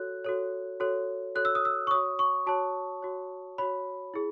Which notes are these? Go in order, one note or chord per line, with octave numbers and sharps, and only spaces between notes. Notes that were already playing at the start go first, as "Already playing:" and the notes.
Already playing: F#4 A4 C#5 F#6
F#4 A4 C#5
F#4 A4 C#5
F#4 A4 C#5 F#6
E6
D#6
E6
C#6
F#4 C#5 D#6
C#6
F#4 C#5 A5
F#4 C#5
F#4 C#5 B5
E4 G#4